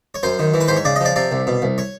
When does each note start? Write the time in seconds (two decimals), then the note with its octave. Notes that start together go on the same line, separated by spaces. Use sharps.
0.15 C#5
0.23 F#2 C5
0.39 D#3
0.54 E3
0.61 B4
0.68 G#2 C5
0.76 C#5
0.85 C#3 D5
0.96 D#5
1.01 F3 D5
1.16 C3 D5
1.32 C2
1.47 B2
1.62 C2
1.78 C#5